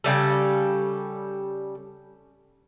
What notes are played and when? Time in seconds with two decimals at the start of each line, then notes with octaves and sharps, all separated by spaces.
0.04 C#3 G3 A4